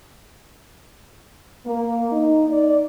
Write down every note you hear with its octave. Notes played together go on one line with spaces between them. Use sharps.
A#3
D#4
D5